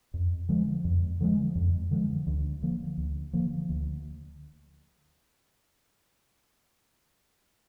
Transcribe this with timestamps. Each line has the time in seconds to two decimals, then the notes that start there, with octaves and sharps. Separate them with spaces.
0.14 F2
0.49 D3 F3 G#3
0.84 F2
1.21 D3 F3 G#3
1.55 F2
1.91 D3 F3 G#3
2.27 D2
2.63 D3 F3 A#3
2.98 D2
3.33 D3 F3 A#3
3.69 D2